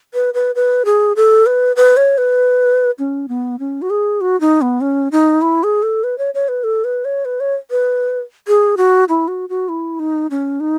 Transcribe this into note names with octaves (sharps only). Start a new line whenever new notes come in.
B4
B4
B4
G#4
A4
B4
B4
C#5
B4
C#4
B3
C#4
F#4
G#4
F#4
D#4
B3
C#4
D#4
E4
G#4
A4
B4
C#5
C#5
B4
A4
B4
C#5
B4
C#5
B4
G#4
F#4
E4
F#4
F#4
E4
D#4
C#4
D#4